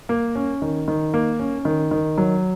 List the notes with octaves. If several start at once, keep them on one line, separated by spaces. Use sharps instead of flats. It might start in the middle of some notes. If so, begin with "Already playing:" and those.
A#3
C#4
D#3
D#3
A#3
C#4
D#3
D#3
F#3